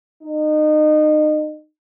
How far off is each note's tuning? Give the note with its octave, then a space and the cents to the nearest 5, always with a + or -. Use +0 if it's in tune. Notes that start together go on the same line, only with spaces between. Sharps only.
D#4 -30